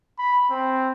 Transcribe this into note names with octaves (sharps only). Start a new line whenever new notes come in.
B5
C4